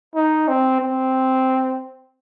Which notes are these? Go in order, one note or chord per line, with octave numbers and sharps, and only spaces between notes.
D#4
C4
C4